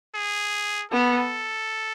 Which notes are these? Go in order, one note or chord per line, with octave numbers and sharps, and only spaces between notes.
G#4
B3 A4